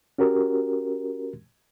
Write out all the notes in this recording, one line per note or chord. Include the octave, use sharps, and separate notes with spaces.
C#4 F#4 G4 A#4